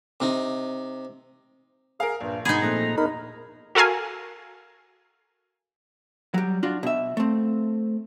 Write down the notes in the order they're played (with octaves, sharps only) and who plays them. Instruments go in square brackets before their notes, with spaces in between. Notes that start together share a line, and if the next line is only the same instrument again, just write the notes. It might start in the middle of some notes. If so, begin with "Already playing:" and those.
[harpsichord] C3 D#4
[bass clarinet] G#4 [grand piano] A#4 F5
[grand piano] A#1 [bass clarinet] G2
[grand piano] G#2 B2 [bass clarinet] B3 [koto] D#4 G#4 [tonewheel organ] G#6
[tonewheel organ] A#2 A#5 [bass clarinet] F3 [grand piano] A3 C4 F#6
[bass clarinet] E2 [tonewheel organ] D#4 A#4 [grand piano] B5
[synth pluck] F#4 A4 A#4 F5 G#5
[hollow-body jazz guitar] F#3 G3
D4 F4 F#4
B2 E5
A3 C4